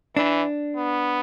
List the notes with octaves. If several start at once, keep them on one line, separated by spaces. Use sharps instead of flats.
E3 D4
B3